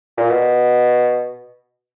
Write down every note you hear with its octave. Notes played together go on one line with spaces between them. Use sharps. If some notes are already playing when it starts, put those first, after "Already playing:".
A#2
B2